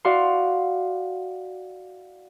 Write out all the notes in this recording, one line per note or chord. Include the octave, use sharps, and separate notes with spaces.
E4 F#4 D5 F5 C6